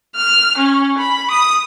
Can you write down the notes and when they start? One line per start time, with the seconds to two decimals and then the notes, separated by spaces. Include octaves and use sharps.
0.15 F6
0.58 C#4
0.98 B5
1.31 D#6